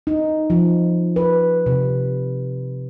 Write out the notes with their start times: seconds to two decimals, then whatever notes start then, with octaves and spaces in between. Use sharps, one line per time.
0.07 D#4
0.50 F3
1.16 B4
1.66 C3